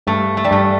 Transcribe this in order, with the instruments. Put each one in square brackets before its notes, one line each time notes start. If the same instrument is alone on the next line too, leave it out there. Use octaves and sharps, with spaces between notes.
[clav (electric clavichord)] G2 [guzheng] A3
[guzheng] A3
G3
[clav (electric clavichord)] G2 [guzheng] A3